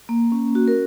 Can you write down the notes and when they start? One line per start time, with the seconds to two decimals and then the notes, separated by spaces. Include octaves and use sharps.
0.09 A#3
0.32 C#4
0.55 F#4
0.68 A#4